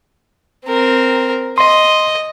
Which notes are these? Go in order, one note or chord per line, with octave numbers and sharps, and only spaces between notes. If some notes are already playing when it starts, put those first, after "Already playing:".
C4 A#4
D#5 C6